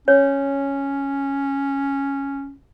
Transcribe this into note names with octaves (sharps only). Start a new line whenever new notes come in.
C#4 C#5